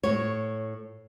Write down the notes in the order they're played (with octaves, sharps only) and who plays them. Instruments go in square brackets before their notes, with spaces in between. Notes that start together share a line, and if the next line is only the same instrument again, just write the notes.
[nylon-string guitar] A2 C#5